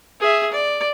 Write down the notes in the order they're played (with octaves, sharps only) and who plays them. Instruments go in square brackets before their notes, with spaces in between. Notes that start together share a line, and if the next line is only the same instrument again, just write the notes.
[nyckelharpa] G#4 E5
D5